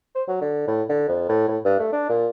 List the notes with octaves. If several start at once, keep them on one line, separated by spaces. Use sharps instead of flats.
C5
F#3
D3
A2
D3
F2
A2
A2
G2
A3
D4
A#2